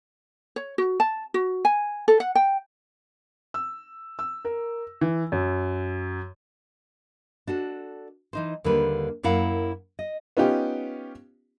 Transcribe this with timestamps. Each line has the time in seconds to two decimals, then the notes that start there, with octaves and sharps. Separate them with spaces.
0.56 C#5
0.78 F#4
1.00 A5
1.34 F#4
1.65 G#5
2.08 A4
2.20 F#5
2.35 G5
3.54 E6
4.19 E6
4.45 A#4
5.01 E3
5.32 F#2
7.47 D4 F#4 A4
8.33 E3 D#4 C5
8.64 D#2 D3 G3 A#3 B4
9.23 F#2 A#3 E4 F5 F#5
9.99 D#5
10.37 B3 C#4 D#4 F4 G4